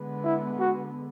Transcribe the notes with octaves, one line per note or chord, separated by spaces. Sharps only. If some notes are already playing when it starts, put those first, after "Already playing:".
Already playing: D3 G#3 B3
E4
F#4